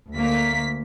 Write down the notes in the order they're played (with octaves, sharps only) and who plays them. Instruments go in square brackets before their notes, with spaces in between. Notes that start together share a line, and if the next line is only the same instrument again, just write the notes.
[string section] D2 B6 [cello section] A#3